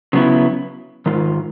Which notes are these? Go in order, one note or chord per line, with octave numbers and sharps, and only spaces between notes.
C#3 F#3 B3 E4
G#2 D#3 F4